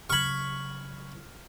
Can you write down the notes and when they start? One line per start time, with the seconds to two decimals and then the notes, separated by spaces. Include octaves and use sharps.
0.10 C#3 F#3 B5 C#6 F6 G#6